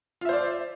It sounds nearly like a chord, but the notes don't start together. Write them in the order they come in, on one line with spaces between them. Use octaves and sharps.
F4 E5 C5 D5